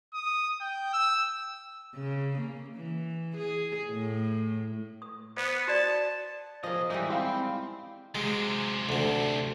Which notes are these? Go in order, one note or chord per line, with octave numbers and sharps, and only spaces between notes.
D#6
G5
E6
C#3
A#3
E3
G#4
A2
D#6
B3 C5
F#4 D5 A5
B1 F3 G#4 A#4 D#5
E3 G3 G#3 D#4
C4 E4 F5 B5
F#2 C3 G#3
D2 D3